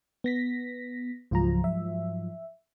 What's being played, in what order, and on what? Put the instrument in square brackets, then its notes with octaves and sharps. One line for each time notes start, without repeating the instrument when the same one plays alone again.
[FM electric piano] B3 A#6 B6
[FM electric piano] C#2 F4 A#5 [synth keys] G#2 F3 F#3
[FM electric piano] E5